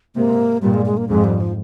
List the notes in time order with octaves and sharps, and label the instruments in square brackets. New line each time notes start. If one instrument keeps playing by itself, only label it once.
[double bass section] G#2 C3 [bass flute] A#3
[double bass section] G2 A#2 [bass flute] G3
[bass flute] G#3
G#3
A#3
[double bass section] F2 G#2 [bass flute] G#3
[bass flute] G3
F3